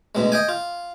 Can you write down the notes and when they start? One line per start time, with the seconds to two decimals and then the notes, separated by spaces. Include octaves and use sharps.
0.15 D2 B2 G#3
0.32 D#5 G5 G#5
0.49 F4